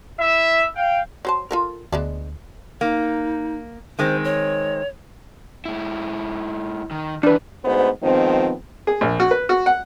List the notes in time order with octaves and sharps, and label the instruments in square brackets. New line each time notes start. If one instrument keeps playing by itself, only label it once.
[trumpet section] E4 E5
F5 G5
[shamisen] F#3 C5 A5
F4 A4 A#4
[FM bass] D2 [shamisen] G#3 B3 D4
[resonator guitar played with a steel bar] A#3 [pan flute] D#4
[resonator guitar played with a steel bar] D#3 G#3 C4 [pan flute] C5
[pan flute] C#5
[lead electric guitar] G#2 E4
D#3
[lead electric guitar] D3 E3 [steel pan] D4 B4
[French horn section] D2 G#2 B3 C5
D#3 F3 G#3 B3 C4
[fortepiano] G#4
A#1
F#4
B4
F#4
F#5